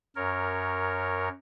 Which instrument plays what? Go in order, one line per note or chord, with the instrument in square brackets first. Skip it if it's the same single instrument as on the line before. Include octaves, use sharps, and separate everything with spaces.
[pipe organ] F#2 A#4 C#5